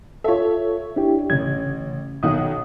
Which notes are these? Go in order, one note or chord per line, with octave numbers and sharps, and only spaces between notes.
F4 A4 C#5 E5
D4 E4 G4
A1 C#3 G#6
B1 D#3 F#5 D#6